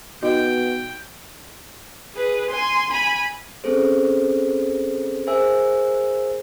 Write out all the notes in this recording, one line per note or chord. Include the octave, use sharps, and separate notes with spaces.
B2 D#4 F#4 D#5 G5
G#4 B4
G#5 C6
G#5 B5
C4 C#4 G#4 A4 C5
G#4 A#4 C5 E5 G#5 E6